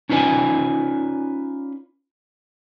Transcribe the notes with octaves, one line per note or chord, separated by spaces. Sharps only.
C#4 D#4 F4 B4 D5 G#5